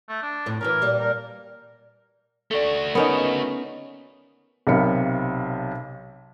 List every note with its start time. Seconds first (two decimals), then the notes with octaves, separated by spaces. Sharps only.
0.09 A3
0.22 D4
0.46 F2 A2 C4
0.61 E3 F#3 C#4 A#4
0.82 A#2 G3 D4
0.99 A#4
2.51 A3 F#4 A4 D5
2.95 B3 C#4 D#4 A#4 B4
4.67 B1 C3 A#4 F5 B5 C#7